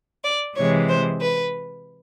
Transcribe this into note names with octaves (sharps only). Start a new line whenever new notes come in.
D5
C3 E3 G#3 C#5
C5
B4